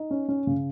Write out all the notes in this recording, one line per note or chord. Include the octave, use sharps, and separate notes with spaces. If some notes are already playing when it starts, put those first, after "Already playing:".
Already playing: D#4
C#4
C#4
C#3